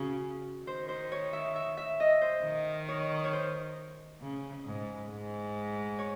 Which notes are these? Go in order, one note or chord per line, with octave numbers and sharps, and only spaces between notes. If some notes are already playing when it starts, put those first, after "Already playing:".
Already playing: C#3 F#4
D#3 C5
C5
C#5
E5
E5
E5
D#5
C5
D#3
C#5
C#5
C5
C#3
G#2
G#2
C#5